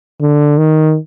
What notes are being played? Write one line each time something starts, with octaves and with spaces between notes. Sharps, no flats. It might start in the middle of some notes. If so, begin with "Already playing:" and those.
D3
D#3